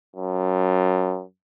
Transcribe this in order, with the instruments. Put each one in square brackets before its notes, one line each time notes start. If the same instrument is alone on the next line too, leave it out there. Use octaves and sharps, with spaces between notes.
[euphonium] F#2